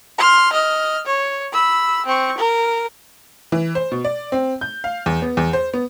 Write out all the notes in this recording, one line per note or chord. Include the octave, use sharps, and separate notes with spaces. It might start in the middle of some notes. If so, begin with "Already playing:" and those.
C6 F6
D#5 F6
C#5
B5 E6
C4 C#6
A#4
E3
C5
B2
D5
C4
G6
F5
E2
B3
E2
C5
B3